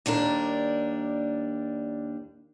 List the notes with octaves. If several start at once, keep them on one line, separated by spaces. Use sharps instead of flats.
D#2 G3 D4 A#4